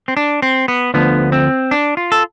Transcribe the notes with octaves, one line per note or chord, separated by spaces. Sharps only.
C4
D4
C4
B3
D2 D3 F3 B3
C4
D4
F4
A4